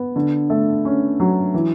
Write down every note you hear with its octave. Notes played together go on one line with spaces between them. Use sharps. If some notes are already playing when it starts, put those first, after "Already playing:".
Already playing: B3
D3
A3
C#4
F#3
E3